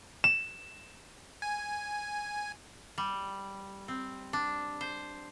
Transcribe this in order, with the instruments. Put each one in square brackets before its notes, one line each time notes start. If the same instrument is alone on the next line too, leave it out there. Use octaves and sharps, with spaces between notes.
[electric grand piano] E7
[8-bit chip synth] G#5
[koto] G3
C4
D4
C5